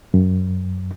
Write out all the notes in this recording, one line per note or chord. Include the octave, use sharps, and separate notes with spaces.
F#2